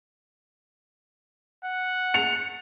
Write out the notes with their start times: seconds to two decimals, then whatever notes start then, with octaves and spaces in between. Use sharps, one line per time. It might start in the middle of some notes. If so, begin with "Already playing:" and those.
1.65 F#5
2.14 C#7 F7